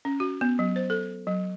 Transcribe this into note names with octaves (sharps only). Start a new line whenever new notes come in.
C#4
F#4
B3
F#3
C5
A4
F#3